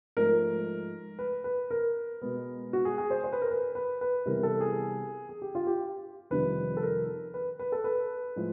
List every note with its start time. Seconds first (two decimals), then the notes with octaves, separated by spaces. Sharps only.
0.17 G#2 F3 A3 A#4
1.19 B4
1.44 B4
1.71 A#4
2.22 B2 G#3 B3
2.73 F#4
2.85 G#4
2.98 G#4
3.10 C5
3.24 C5
3.33 B4
3.42 A#4
3.51 B4
3.75 B4
4.01 B4
4.26 C3 E3 G3 B3 A#4
4.43 A4
4.61 G#4
5.29 G#4
5.42 G4
5.55 F4
5.67 G4
6.30 F2 C3 D#3 G3 B4
6.77 A4
6.83 A#4
7.34 B4
7.59 B4
7.72 A4
7.84 B4
8.36 A2 F3 G#3